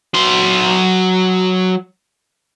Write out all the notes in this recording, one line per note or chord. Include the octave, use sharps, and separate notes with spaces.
F#3 C6